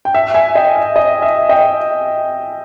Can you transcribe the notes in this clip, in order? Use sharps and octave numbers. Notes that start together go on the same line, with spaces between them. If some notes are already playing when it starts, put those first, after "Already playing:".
G5
E5
E5 G#5
D#5 G5
E5
D#5
E5
D#5 G5